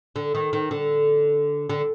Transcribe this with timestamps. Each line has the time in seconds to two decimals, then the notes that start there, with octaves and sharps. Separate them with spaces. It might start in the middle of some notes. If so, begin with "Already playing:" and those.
0.16 D3
0.35 D#3
0.53 D#3
0.71 D3
1.70 D3